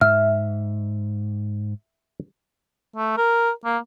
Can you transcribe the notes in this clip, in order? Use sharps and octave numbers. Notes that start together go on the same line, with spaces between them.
G#2 E5 F6
A3
A#4
A#3